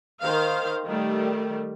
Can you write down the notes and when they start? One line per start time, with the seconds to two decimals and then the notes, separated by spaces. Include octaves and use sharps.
0.20 D#3 C5 F5
0.85 D#3 G3 A3